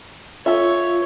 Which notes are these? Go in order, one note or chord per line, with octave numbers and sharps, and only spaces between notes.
F4 A4 C#5 E5